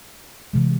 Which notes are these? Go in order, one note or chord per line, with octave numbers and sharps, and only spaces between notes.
C3 E3 G#3